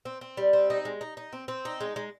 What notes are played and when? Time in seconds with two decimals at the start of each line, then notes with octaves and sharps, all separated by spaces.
0.05 C4
0.21 C4
0.37 G3
0.53 C4
0.70 D#4
0.85 G#3
1.01 D#4
1.17 D#4
1.33 C4
1.48 C4
1.65 D#4
1.80 G#3
1.96 G#3